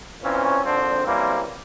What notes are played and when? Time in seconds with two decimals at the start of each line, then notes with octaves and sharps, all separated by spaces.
0.23 A#2 E3 C4 C#4
0.65 G#1 D3 F3 C4 D4
1.06 F#2 E3 G3 A#3 C4